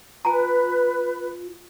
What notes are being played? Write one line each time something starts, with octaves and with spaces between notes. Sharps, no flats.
F4 B4 G#5 A#5